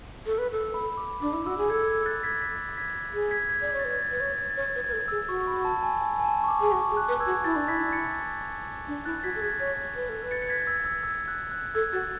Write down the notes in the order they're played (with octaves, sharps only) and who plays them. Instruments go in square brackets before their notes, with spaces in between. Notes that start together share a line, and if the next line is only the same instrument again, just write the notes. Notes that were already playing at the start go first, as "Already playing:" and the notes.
[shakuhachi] A4
B4
A4
[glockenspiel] B5
D6
[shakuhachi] D4 [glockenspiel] D6
[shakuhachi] E4
[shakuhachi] F#4 [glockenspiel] E6
[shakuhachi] G#4
[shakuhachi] A4 [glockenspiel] E6 G#6
[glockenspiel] E6 G#6
F#6 A6
G#6 B6
G#6 B6
G#6 B6
[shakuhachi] G#4
[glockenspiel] G#6 B6
G#6 B6
[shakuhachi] D5
[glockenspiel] G#6
[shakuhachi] C#5
[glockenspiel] A6
[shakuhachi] B4
[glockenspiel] G#6
A6
[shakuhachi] B4 [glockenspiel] G#6
[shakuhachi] C#5 [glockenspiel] A6
[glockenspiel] G#6
A6
[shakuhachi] C#5
[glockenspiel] G#6
[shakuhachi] B4 [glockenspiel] A6
[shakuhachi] B4 [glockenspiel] G#6
[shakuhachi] A4
[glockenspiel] A6
E6 G#6
[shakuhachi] G#4
[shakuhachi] F#4 [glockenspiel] C#6
[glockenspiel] B5
A5
G#5
G#5
G#5
A5
C#6
D6
[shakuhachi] G#4
[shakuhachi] F#4 [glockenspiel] C#6
[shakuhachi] G#4
[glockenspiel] F#6
[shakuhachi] B4
[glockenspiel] E6 G#6
[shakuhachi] F#4
[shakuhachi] E4 [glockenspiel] F#6 A6
[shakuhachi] D4
[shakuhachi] E4 [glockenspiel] G#6 B6
[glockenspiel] A6 C#7
[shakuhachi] D4
[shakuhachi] E4 [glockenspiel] F#6 A6
[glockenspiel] A6
[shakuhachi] F#4 [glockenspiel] G#6 B6
[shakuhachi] A4
[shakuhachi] G#4 [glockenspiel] G#6 B6
[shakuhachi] C#5 [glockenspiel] G#6 B6
[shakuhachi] B4
A4
B4
[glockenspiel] A6 C#7
C#7
G#6 B6
E6 G#6
E6 G#6
E6 G#6
F#6
F#6
[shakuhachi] A4 [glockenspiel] E6 G#6
[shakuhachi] F#4 [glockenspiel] F#6 A6